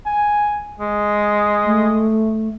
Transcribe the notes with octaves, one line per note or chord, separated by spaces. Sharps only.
G#5
G#3
A3